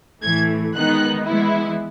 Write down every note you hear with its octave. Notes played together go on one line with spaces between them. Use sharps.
A2 E3 A3 G#6
D#3 G#3 B3 D#4 F#6
E3 G#3 B3 E4